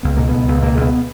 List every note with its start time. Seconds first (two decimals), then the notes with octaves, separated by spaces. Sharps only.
0.03 C#2 B3
0.17 B2 A#3
0.28 B3
0.34 C#2
0.48 C#2
0.62 B2 A#3
0.77 C#2
0.82 B3